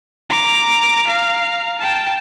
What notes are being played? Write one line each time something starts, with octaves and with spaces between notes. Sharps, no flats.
A#5 D6
F5 A#5
G5 A5